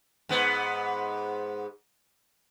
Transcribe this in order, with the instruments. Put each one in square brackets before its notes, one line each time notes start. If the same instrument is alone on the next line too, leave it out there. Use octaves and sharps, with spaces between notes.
[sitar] G#2 B3